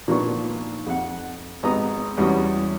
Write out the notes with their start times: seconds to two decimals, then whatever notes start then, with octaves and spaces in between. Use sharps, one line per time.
0.08 A#2 D#3 F3 B3 D4 C#6
0.86 F2 F#5
1.63 G#1 B3 A#5 D#6
2.18 E2 G3 C#4 F#4 D#6